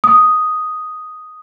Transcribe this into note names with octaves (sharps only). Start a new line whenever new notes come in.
D#6